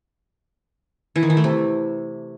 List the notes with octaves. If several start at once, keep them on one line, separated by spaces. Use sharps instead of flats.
E3
D#3
E3
A3
C3